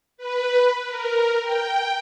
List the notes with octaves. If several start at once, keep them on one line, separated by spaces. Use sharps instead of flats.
B4
A#4
G5